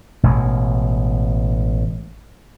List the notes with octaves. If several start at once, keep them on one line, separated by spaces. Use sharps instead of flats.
A1 B2 G#3